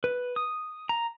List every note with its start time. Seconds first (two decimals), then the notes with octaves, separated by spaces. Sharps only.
0.04 B4
0.36 D#6
0.89 A#5